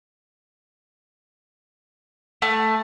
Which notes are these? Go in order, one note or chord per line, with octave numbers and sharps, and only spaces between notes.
A3